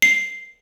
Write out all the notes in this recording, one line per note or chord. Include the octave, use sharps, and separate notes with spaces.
C7